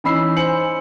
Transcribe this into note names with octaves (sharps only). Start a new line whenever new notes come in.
E3 C#4 D#4 B5 E6 C7
C5 G#5 C#7 F#7